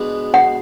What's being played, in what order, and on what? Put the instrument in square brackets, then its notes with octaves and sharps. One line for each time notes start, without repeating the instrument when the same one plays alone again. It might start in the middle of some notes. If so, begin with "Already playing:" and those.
Already playing: [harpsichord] B2 G#3 B3 D4 G#4
[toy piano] F#5